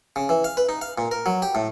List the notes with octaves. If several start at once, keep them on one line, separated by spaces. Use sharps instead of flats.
C#3
E3
F5
B4
D#4
F5
A#2
A#4
F#3
G4
A2